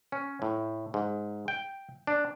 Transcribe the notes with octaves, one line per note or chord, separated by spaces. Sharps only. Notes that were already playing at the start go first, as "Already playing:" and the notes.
C#4
A2
G#2
G5
D4